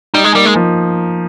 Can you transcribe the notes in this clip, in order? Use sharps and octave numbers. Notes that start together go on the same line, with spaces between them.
G3 D#4
G#3
G3 A#3
G#3
F3